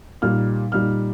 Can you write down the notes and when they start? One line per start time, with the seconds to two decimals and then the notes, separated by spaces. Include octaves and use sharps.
0.22 A#2 G3 D#4 F6
0.72 A#2 G3 D#4 F6